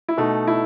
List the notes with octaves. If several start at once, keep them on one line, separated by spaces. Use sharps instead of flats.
E4
B2 A3 D#4
E4